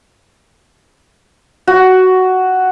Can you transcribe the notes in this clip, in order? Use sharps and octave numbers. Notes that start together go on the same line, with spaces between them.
F#4